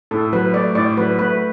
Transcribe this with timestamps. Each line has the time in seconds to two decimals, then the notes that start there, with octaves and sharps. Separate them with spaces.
0.11 A2 A4
0.32 F#3 B4
0.54 A3 D5
0.75 A2 D5
0.97 F#3 B4
1.18 A3 B4